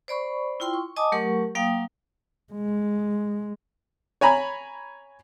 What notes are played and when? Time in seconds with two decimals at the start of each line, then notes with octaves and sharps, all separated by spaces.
0.08 C5 D5 B5 C#6
0.60 E4 F4 G5 C6
0.74 C#6
0.96 D#5 G#5 A5 D6 D#6
1.12 F#3 A3 G4 A#4 F#5 C#6
1.55 F#3 A#3 F5 G5 D#6
2.53 G#3
4.21 C#5 G#5 A#5 B5